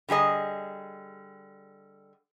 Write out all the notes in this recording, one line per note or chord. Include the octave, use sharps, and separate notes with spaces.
D3 G3 G#4 D#5